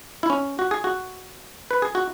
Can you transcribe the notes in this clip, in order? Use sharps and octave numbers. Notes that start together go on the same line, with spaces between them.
E4
C#4
F#4
G#4
F#4
B4
G#4
F#4